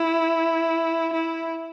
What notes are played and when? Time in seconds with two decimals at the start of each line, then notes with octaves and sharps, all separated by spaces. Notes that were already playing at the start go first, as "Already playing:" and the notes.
Already playing: E4
1.14 E4